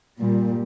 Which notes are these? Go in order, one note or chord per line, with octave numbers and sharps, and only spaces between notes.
A#2 G3